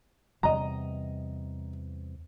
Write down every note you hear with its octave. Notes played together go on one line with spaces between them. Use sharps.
E2 C3 G3 D#5 A#5